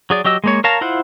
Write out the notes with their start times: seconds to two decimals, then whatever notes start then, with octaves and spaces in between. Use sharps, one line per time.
0.10 F#3 G#4 D5
0.25 F#3 G4 D#5 E6
0.44 G#3 A#3 C#5
0.64 A#4 C#5 F5 A5 A#5
0.81 E4 F4 C5 F#5